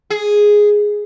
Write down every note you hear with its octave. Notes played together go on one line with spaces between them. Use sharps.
G#4